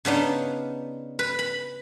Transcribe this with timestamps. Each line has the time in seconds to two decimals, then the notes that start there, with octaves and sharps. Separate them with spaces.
0.05 C#3 B3 D4 D#4
1.19 B4
1.39 B5